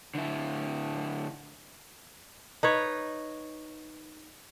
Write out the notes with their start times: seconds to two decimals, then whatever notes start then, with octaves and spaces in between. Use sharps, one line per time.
0.15 D3 E4
2.63 D#4 B4 C#5